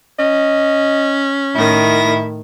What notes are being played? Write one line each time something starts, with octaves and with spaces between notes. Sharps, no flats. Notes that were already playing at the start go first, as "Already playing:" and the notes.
C#4 D#5
A2 D#3 E4 A#6